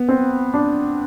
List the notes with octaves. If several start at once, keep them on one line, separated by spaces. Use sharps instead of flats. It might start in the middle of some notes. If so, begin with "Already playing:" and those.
Already playing: B3
C4
D4